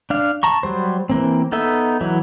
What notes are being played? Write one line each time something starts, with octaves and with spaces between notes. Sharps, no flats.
D4 F5
A5 A#5 C#6
F#3 G3 C5
E3 A#3 C4
B3 D#4 A4 E5 E6
E3 F#3 E4